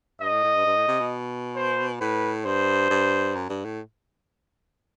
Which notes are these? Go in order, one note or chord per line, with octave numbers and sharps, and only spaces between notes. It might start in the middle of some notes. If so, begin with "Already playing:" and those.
G2 D#5
A2
A2
G2
G2
A2
C3
B2
C5
A2 B4
G2 C5
G2
F#2
G2
A2